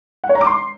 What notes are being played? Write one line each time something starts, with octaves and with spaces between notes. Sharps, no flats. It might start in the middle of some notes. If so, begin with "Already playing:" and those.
F#5
C#5
A#5
D6
C6